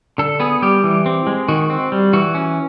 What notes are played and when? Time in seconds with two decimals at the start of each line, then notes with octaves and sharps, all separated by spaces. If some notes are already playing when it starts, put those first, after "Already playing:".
0.18 D3 A4
0.40 B3 G#4
0.62 G3 G4
0.84 E3
1.06 C4
1.27 G#3
1.48 D#3 F#4
1.70 C4
1.92 G3
2.13 E3 F#4
2.35 C#4